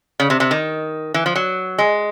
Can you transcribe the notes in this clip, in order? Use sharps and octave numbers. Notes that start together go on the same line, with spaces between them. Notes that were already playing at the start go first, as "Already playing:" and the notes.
C#3
C3
C3
D#3
E3
F3
F#3
G#3